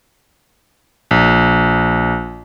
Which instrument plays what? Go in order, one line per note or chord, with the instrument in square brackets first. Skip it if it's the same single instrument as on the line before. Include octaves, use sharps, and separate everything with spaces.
[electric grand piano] A#1